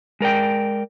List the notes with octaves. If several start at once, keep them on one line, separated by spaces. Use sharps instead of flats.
G#3 A#4 D5 G5